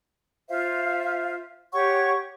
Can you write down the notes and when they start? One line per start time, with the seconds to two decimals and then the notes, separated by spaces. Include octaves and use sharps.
0.50 F4 C5 E5 F5
1.72 G4 C#5 F#5 C#6